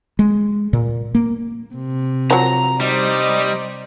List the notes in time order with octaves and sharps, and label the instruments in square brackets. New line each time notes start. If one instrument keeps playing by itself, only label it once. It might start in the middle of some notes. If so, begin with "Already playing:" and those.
[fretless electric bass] G#3
A#2
A#3
[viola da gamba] C3
[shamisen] F3 F#3 [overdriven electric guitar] A#5
[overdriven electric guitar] G3 [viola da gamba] D#4 C5 D5 [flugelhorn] D#5